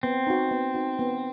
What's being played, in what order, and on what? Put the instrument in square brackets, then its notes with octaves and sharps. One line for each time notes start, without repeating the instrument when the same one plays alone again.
[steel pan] B3 [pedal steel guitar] C4
[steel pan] D#4 F#4
B3
D#4 F#4
B3